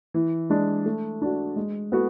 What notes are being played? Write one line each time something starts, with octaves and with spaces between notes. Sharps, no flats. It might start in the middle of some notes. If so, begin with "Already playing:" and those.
E3
G#3 D4
A3
D4 F#4
G#3
B3 F#4 A4